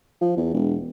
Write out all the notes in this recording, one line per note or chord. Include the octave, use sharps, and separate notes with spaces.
F3
E2
E1